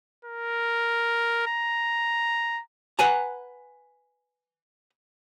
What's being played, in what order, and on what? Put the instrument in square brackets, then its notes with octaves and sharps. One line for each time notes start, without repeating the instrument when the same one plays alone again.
[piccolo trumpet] A#4
A#5
[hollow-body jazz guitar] B4 F#5 G#5 A#5